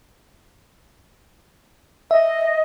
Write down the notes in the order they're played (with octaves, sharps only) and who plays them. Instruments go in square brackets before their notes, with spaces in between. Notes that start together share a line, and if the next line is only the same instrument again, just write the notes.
[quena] D#5 [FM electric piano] E5